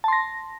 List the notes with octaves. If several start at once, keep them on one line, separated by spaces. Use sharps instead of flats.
A5 C6 A#6